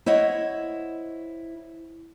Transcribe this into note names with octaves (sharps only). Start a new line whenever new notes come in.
E4 C5 C#5 D#5 F#5